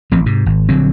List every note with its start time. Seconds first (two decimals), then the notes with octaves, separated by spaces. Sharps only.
0.11 A1 F3 C4
0.26 G#2 C3
0.46 G#1
0.69 A#1 D3 F#3 C4